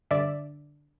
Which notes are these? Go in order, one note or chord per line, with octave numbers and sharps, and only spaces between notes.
G2 D3 D5 E5